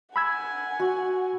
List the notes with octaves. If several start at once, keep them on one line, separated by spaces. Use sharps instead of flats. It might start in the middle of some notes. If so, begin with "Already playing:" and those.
F#5 G#5 B5 E6 G#6
F#4